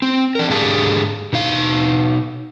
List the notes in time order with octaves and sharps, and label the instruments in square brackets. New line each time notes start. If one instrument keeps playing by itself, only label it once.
[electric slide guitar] C4
D4 A#4
G#2 D3 G4 G#4 F5 A5
B2 D#4 F5